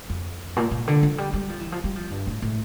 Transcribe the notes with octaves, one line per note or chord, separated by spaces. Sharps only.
F2
A#2
A#2
D3
F3
G3
G3
F3
E3
F3
G3
F3
G2
A2
A2